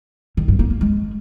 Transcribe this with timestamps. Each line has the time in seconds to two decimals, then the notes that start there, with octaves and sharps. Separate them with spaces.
0.37 D#3
0.48 G2
0.59 A#3
0.70 A#3
0.81 G#3